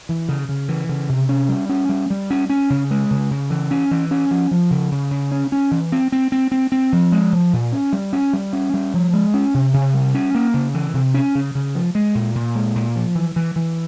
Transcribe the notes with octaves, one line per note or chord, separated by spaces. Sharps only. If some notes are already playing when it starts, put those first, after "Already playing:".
E3
C#3
C#3
E3
C#3
C3
C#4
G3
C#4
G3
G3
C#4
C#4
C#3
G#3
C#3
C#3
E3
C#4
E3
C#4
F3
F3
C#3
C#3
C#3
C#4
C#4
E3
C4
C4
C4
C4
C4
F3
G#3
F3
A#2
C#4
G3
C#4
G3
C#4
G3
F3
G#3
C#4
C3
C3
G3
C#4
A#3
C#3
E3
C3
C#4
C#3
C#3
F3
G#3
A#2
A#2
G#3
A#2
F3
E3
E3
E3